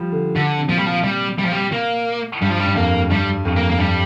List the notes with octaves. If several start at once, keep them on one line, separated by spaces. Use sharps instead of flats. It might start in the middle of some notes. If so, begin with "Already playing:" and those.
Already playing: F3 G3
D3
D3
C3
A#2 F3
G3
F3
G3
G3
F3
G3
A#3
G2 G3
F3
G3
G2
F2 A#3
G2 G3
F2
A#3
A#3
G2 G3